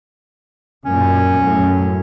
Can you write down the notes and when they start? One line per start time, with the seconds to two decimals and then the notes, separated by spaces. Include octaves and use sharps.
0.85 F#2 A#2 C#4
1.40 F#2 A2